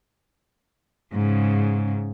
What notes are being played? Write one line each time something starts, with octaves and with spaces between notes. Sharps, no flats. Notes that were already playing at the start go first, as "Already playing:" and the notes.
G#2 C#3